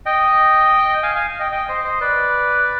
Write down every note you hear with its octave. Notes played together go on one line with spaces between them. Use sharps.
D#5 G5
F5 G#5
F5 G#5
D#5 G5
D#5 G5
C5 D#5
C5 D#5
B4 D5